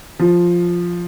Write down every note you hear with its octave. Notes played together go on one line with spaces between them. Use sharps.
F3